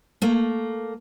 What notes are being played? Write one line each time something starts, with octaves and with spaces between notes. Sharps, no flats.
A3 A#3